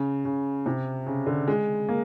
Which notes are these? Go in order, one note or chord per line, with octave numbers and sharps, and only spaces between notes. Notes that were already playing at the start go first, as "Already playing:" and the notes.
Already playing: C#3
C#3
C3
C#3
D3
G#3
A#3